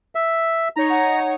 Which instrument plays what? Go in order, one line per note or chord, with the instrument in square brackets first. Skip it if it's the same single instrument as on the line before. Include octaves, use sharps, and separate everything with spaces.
[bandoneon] E5
[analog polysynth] D#4 C#5 [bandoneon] A#5
[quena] F#5